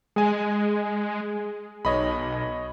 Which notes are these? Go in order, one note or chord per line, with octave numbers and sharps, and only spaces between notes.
G#3 G#4 G#5
B1 C#5 D#5 B5